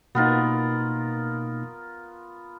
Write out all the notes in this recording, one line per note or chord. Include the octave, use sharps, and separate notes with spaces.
B2 A#3 B3 D#4 F4 A#4